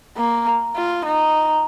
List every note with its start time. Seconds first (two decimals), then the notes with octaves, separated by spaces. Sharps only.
0.17 A#3
0.76 F4
1.05 D#4